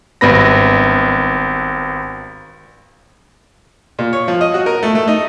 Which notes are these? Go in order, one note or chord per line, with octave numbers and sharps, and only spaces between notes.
G#1 G2 B3 B5 A#6
A#2
C#5
F3
D#5
F#4
A#4
A3
A3
D#4